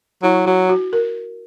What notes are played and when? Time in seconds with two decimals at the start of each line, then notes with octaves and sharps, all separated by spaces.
0.23 F#3 E4
0.46 F#3 F#4
0.69 F#4
0.93 A#4